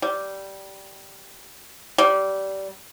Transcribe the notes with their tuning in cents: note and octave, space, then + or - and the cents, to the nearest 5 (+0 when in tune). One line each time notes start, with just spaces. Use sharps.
G3 -10
G3 -20